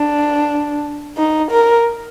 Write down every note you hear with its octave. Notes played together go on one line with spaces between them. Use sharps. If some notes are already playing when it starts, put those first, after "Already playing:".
Already playing: D4
D#4
A#4